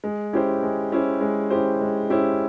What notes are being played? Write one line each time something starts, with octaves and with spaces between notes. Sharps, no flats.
G#3
C#4 E4 G4 C5
G#3
C#4 E4 G4 C5
G#3
C#4 E4 G4 C5
G#3
C#4 E4 G4 C5